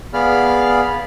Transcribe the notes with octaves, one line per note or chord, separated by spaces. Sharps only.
B3 G#4 D5 F5 B5 F6